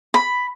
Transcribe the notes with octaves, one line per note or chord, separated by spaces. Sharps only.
B5